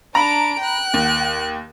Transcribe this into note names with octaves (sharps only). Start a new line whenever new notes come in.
D4 A#5 B5 D7
G5 F#6
D#2